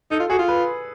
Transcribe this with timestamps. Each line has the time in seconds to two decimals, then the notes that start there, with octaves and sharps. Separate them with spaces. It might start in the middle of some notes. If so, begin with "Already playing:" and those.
0.11 D#4 A4
0.20 F4
0.30 F#4 G#4
0.39 F4
0.48 B4